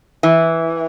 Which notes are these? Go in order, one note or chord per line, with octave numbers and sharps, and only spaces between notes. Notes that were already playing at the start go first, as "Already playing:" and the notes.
E3